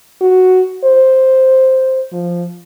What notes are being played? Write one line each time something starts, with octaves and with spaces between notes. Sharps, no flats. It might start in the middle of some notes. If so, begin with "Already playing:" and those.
F#4
C5
F3